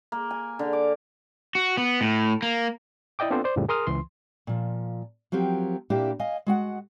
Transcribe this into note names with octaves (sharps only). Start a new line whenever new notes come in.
A#3
G#5
D3
D6
F#4
B3
A2
A#3
E4 D5 D#5 G5 D6
B3 C4 D4 F4 A4 C5
C5 D5
F2 A2 C#3 F3 G3
G#4 A#4 C6 D#6 F6
C#2 E3 C6
A#2 F3
F3 F#3 C4 G4 A#4
A#2 A#3 D4 E4 G4
D#5 F5 G#5
G#3 F#4 F#5